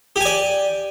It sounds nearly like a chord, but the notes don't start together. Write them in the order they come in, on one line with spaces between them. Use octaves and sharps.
G4 G#5 D5